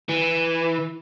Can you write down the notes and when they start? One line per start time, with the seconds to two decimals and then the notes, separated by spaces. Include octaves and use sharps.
0.09 E3